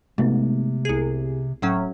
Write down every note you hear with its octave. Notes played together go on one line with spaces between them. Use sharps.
G#1 C3 G#3 A3 B3
C2 G#4
D1 A2 F#3 C#4